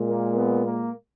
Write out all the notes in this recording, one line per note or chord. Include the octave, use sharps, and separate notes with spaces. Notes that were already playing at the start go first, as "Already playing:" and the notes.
Already playing: A#2 G#3
A#3
B3
A#3